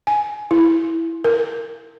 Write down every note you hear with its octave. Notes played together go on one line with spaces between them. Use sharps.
G#5
E4
A#4